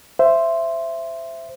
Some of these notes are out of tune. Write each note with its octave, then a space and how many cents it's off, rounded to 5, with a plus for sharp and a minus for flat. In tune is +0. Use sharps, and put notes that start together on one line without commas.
C5 +0 E5 +15